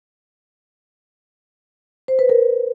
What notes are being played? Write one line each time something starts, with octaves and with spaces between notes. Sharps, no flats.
C5
B4
A#4